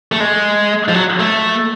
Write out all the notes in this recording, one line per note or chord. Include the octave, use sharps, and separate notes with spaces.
A3
G#3
F3
F#3
A3